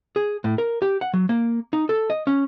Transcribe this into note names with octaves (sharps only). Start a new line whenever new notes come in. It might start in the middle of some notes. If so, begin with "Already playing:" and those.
G#4
A2
A#4
G4
F#5
F#3
A#3
D#4
A4
D#5
C#4